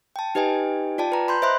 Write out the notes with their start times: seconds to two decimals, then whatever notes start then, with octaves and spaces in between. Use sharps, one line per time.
0.16 G5 A5
0.35 D#4 G4 B4 D#5 G5 G#5
0.98 F4 D5 G5 A5
1.12 B4 A#5
1.28 B5 C6 G6
1.42 C5 D#5 E5 B5 C6 F#6